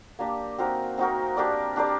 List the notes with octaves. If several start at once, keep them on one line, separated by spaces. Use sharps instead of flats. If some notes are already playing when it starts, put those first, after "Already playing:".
A#3 D4 G4
C4 D#4 F#4 A#4
C4 D#4 F#4 A#4
D4 G4 A#4 D5
D4 G4 A#4 D5